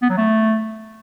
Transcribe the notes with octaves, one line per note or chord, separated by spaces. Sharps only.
B3
F#3
A3